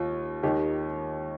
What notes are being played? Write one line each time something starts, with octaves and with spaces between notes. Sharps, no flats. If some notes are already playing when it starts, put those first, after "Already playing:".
Already playing: D#2 F4
D#2 D#3 G4